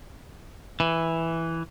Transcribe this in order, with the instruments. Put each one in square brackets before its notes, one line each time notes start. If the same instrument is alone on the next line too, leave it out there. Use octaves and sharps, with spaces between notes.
[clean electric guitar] E3